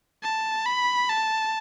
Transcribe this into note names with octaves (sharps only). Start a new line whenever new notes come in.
A5
B5
A5